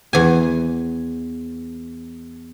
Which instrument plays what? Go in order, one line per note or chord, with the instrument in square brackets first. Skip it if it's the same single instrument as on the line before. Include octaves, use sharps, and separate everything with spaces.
[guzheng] E2 G#5